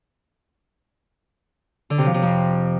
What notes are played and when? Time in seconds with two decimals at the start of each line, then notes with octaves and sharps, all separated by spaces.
1.90 D3
1.98 C3
2.06 F3
2.14 C3
2.22 F2